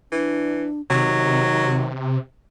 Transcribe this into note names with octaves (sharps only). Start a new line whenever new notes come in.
E3 D4
C3 D#3 F#3